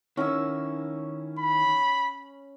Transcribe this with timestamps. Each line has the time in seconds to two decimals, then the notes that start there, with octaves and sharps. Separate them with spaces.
0.17 D#3 C#4 E4 F#4 E6
1.39 B5